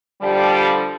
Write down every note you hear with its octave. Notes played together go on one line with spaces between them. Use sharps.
D3 F3 G3